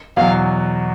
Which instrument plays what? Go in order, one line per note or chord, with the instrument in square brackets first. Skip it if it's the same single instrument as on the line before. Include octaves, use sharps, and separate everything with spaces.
[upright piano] E2 B2 F#3 [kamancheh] F5